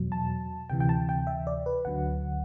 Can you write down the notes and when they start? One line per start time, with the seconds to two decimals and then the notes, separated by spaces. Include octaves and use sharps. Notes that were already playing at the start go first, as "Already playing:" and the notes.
Already playing: E2 B2 F#3
0.12 A5
0.70 D2 C3 E3 G5
0.80 G5
0.89 A5
1.09 G5
1.27 E5
1.47 D5
1.66 B4
1.85 D2 D3 F#3 F#5